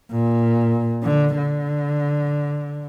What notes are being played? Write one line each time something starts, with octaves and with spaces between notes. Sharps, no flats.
A#2
D3
D3